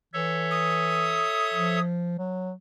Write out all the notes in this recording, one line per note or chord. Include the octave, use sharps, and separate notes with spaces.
E3 A4 C#5 E5
D#6
F3
F#3